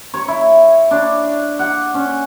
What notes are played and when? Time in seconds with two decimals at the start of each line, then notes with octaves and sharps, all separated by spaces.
0.14 C#5
0.28 E4
0.91 D4
1.59 F#5
1.94 C#4